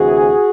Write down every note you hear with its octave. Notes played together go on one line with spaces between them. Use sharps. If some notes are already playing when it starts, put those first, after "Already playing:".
Already playing: D2 C3 E3 F#4 G#4